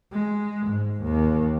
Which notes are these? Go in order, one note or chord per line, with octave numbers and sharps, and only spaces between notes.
G#3
G#2
D#2